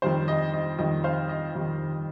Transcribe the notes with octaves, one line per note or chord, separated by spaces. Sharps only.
F2 D#3 G3 C5
D#5
D#5
F2 D#3 G3 D#5
C5 F5
D#5
F2 D#3 G3